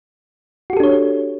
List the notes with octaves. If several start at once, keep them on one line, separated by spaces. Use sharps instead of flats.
D4 F#4 G4 A4 C#5